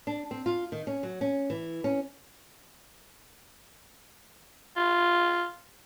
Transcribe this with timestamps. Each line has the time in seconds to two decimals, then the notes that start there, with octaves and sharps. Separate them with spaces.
0.07 D4
0.31 C4
0.46 F4
0.72 D#3
0.87 C#4
1.03 F#3
1.21 C#4
1.50 E3
1.84 C#4
4.77 F4